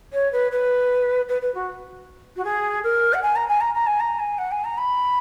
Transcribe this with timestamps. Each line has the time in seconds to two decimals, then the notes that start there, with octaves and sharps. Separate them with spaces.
0.13 C#5
0.32 B4
0.52 B4
1.29 B4
1.42 B4
1.55 F#4
2.37 F#4
2.45 G#4
2.84 A#4
3.14 F#5
3.22 G#5
3.36 A#5
3.48 G#5
3.61 A#5
3.74 A#5
3.87 G#5
4.00 A#5
4.19 G#5
4.38 F#5
4.51 G#5
4.64 A#5
4.78 B5